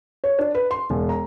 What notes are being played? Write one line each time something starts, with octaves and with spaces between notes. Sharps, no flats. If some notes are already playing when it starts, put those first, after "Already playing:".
C#5
D4
B4
C6
E1
A#5